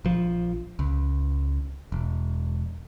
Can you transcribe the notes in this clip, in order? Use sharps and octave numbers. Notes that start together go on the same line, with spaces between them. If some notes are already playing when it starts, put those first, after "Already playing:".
A#1 F3
C#2
E1